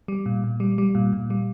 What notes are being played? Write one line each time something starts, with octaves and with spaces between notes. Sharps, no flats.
G3
A#2
A#2
G3
G3
A#2
A#2
G3